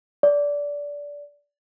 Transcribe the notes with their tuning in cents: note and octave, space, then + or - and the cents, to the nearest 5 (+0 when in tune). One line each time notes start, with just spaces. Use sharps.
D5 -20